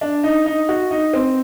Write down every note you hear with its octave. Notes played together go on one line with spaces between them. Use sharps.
D4
D#4
D#4
F#4
D#4
C4